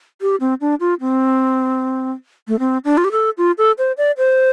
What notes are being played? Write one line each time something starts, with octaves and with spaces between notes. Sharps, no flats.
G4
C4
D4
F4
C4
A3
C4
D4
F4
G4
A4
F4
A4
C5
D5
C5